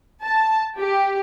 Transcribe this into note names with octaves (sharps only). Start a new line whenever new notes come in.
A5
G4